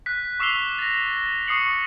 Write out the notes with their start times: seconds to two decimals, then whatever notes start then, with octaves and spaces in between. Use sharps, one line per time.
0.06 F#6 B6
0.40 C#6 D6 E6 C7 F7 G7
0.79 A6 A#6
1.47 C#6 D#6 C7 C#7 F#7